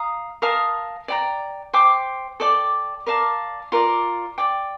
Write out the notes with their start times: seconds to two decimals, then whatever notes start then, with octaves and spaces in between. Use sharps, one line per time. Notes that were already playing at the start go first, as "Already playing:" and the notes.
Already playing: F5 A#5 D#6
0.42 A#4 F5 A5 D#6
1.08 D5 G5 A#5
1.74 C5 G5 D6
2.40 A4 D5 G5 D6
3.06 A#4 D5 F5 A5
3.72 F4 A#4 D5
4.38 D5 G5 D6